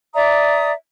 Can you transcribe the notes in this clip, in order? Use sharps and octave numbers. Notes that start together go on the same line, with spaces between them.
D5 E5 A#5 D#6